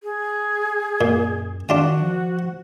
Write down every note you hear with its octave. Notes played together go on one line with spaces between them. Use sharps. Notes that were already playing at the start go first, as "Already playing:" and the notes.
G#4
F#2 A#2
D#3 D4 F4 F#4 G5
F3